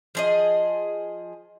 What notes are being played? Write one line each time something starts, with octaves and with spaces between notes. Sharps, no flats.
F3 G#4 D#5